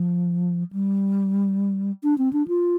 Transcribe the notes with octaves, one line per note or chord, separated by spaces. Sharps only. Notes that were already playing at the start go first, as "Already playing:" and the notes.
Already playing: F3
G3
D4
C4
D4
F4